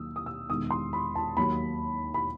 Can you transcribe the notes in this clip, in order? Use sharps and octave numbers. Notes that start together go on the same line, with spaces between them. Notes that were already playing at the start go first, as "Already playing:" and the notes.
Already playing: D#2 D#3 F#3 D#6 E6
D#6
E6
E1 E2 D#3 D#6
C6
B5
A5
D#2 D#3 F#3 B5
B5